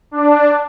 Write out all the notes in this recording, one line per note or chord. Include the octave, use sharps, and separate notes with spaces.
D4